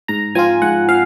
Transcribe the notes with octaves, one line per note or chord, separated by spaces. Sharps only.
G#2 A#5
F3 C4 F4 G#5
G#2 F#5
F3 F5